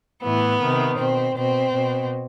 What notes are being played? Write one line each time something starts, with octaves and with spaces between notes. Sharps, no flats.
A2 E3 B3
C3 D#3
B2 C4
B2 C4
B2